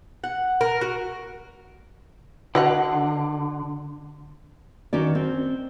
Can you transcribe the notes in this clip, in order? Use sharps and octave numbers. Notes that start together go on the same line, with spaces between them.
F#5
A#4
F#4
D3 F#4 D#5 F#5
D#3 C#4 F#4 D5
C4